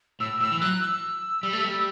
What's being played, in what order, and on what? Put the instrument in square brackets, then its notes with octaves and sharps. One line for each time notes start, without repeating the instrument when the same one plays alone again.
[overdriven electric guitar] A2 [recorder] E6
[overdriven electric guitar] A2 [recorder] E6
[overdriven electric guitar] E3
[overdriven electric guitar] F#3 [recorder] F#6
[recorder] E6
[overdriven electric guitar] G3
A3
G3